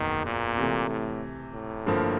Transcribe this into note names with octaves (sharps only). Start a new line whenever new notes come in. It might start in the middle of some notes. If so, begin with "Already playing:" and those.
Already playing: F#1 E2 B2 D#3
A#2
C3 E3 A3
A2
A2
G2 D3 F3 A#3